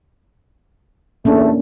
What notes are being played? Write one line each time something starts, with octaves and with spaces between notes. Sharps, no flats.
E2 A3 A#3 C#4 D4